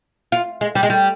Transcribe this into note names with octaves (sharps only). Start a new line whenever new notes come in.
F4
G#3
G3
G#3
G3